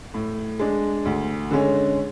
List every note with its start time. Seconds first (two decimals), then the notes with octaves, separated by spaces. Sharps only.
0.14 A2
0.59 G#3 D4
1.05 D2
1.51 D3 G#3 C#4